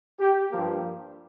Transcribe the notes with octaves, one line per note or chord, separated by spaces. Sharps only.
G4
G2 F3 A#3 G4